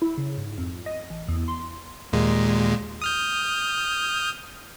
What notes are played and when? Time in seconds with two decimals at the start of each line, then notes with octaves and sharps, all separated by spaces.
0.02 E4
0.18 C#3
0.38 G#2
0.58 F2
0.86 D#5
1.10 A1
1.28 E2
1.48 C6
2.12 D#2 A#2 G#3
3.02 D#6 F6 G6